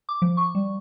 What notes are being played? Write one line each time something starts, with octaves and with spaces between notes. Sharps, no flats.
D6
F3
C#6
G3